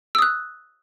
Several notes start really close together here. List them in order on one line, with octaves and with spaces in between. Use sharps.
E6 D#6 F#6